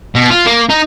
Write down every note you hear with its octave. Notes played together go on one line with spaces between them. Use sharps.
B2
F4
A#3
D#4